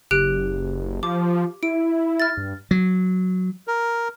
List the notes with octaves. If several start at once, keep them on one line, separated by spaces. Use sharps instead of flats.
F#1 G4 F#6 D7
F3 D6
E4 D7
F6 A6
G2
F#3
A#4